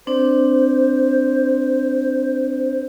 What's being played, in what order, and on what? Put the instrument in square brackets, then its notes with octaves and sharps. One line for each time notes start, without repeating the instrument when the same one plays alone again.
[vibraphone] C4 D4 D5 [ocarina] C5